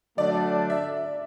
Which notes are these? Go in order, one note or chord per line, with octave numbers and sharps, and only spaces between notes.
D3 F#3 A3 D4 D5
E5